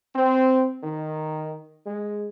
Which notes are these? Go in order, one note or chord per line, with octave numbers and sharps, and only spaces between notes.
C4
D#3
G#3